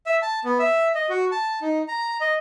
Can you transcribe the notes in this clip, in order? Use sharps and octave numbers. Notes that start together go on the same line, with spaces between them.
E5
A5
B3
E5
D#5
F#4
A5
D#4
A#5
D#5